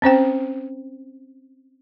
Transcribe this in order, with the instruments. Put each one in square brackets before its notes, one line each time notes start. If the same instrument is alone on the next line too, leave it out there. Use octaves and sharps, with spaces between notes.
[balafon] C4 C#4 C5 G5